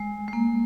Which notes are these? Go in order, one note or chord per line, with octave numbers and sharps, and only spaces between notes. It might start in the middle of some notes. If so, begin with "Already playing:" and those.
Already playing: G#3
G#3
A#3